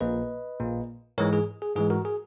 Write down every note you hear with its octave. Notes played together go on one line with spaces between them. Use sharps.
A#1 A#2 A#3 B4 D#5
A#1 A#2 A#3
G#2 E3 G#3 A#4 C#5
G#4
G#4
G#2 E3 G#3 G#4
F#4 A#4
G#4